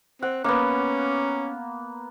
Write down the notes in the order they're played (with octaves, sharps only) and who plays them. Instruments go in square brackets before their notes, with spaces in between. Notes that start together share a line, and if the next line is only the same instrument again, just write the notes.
[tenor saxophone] C4 [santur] F#5
[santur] A#3 B3 [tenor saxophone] C#4